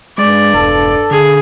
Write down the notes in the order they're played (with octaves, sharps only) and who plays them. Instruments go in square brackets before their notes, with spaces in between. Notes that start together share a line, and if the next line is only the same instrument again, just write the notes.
[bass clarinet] G2 [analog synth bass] G#3 [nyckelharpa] D5
[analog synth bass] E1 [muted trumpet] A4
[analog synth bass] D3 [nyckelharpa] G#4